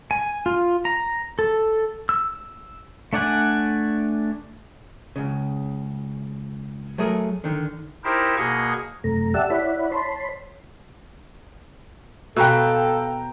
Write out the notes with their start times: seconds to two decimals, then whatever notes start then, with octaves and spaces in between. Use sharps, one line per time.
0.11 G#5
0.46 F4
0.85 A#5
1.39 A4
2.09 E6
3.13 A3 D4 D5 F#5 G#5
5.16 C#2 C#3
6.98 F#3 A3 G#4 A#4
7.44 D3 D#3
8.04 D#4 E4 G4 A#4 C5
8.37 B2 A#3 G#4 D#5 C#6
9.04 F#2 C3 A3 A#5
9.34 G4 D5 E5 F#5 A5 E6
9.50 E4 C#5 D5 E5 F#5 B5
9.92 C#5 A5 B5 C6
12.36 B2 A4 B4 F5 G5 A#5 E6